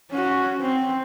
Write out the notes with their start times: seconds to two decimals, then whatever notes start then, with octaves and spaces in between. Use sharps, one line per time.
0.11 C#4 F#4
0.61 C4